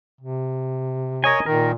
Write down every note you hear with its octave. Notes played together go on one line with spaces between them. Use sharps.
C3
A#4 C#5 D#5 G#5
A#2 D#3 A#4